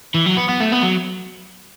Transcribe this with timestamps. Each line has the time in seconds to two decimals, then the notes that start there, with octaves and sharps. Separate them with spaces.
0.14 E3
0.26 F#3
0.37 B3
0.49 B3
0.60 A3
0.72 B3
0.83 F#3